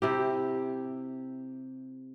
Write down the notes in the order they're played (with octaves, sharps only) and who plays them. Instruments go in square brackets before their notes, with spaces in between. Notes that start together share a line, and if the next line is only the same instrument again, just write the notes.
[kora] C3 E4 G4